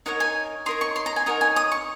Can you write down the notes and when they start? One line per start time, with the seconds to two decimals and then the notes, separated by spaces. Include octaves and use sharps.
0.06 D#4 A#4 C#5 F#5
0.20 G#5
0.66 D#4 A#4 C#5 C6
0.81 C#6
0.96 C6
1.06 A#5
1.16 G#5
1.26 D#4 A#4 C#5 F#5
1.41 G#5
1.56 D#6
1.72 C#6